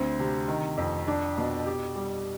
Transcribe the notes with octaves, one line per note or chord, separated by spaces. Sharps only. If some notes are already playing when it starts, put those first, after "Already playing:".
Already playing: D2 C4
C3
D#3
F2
D4
B2
G4
G3